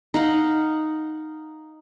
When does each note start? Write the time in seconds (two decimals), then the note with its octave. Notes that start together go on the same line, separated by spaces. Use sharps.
0.14 D#4 F5 F#5